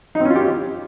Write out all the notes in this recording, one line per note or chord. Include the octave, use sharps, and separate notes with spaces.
D#4
C4
C#4
F4
G4